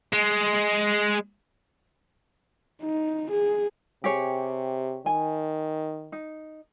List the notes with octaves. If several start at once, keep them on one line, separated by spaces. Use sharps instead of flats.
G#3
D#4
G#4
C3 G4 G#4 C#5
D#3 G#5
D#4